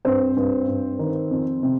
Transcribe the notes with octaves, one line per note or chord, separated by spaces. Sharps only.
G2 C4 C5
G2
G2
D#3
F2
C3